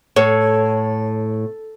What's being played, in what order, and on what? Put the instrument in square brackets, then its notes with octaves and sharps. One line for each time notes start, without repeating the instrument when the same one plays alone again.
[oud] A2 [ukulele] C#5